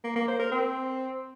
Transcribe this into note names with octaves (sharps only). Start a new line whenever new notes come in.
A#3
A#3
C5
A#4
C4